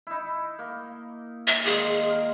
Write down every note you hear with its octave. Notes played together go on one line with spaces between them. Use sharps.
D#4 E4
A#3
E5
A#2 D#3 G#3 G#4
A#4